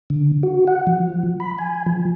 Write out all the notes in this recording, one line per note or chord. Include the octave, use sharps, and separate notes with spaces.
D3
F#4
F#5
F3
B5
G#5
F3